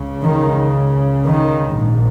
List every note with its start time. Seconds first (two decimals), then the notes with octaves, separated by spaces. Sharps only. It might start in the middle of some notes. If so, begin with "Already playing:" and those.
Already playing: C#2 C#3
0.21 D#3
1.24 D#3
1.74 A#1 G#2